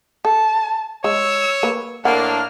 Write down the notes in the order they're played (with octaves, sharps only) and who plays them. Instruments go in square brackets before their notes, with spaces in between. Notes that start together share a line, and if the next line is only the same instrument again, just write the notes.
[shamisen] A4 [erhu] A5
[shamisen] G#3 [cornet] C#5 [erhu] E6
[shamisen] A#3 B4
[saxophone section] A2 A#3 [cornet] D4 [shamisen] F#5 [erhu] F6